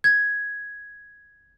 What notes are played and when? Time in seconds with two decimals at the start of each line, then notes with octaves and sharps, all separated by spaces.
0.04 G#6